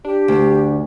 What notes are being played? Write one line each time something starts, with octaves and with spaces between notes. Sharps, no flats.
D4 G4
D2